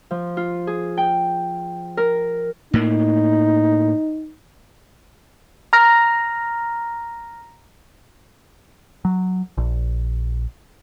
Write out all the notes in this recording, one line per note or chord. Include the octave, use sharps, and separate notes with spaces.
F3
F4
G#4
G5
A#4
A2 A#3 D#4
A#5 F6 A#6
F#3
A#1